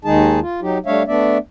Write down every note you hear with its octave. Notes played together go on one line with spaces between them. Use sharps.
D#2 D#3 G#3 D#4 G#4 A5
F4
F#3 D#4 G4
G3 A3 D4 C#5 E5 F5
A3 B3 D4 D5 E5